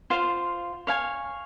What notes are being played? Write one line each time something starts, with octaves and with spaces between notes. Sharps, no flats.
F4 C5 F5
C#5 F5 G#5